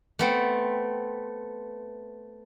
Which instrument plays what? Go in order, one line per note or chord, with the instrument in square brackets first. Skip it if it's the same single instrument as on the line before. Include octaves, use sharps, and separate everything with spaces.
[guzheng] A3 B3 C4